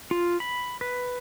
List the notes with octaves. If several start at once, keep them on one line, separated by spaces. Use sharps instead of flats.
F4
B5
B4